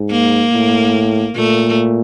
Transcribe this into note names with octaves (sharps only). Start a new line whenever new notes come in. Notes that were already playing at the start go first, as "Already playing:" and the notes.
Already playing: G#2
A#3
A2
A#2 A3